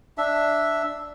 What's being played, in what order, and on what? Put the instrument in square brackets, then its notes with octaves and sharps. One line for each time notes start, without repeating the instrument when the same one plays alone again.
[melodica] D4 E5